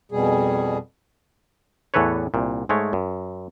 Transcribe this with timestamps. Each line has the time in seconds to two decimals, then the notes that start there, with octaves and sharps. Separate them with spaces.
0.12 F2 B2 G3 G#4
1.94 E2 A2 E3 A4 B4 C#5
2.34 C2 A#2
2.69 G#2 G#3 A3 C#5
2.93 F#2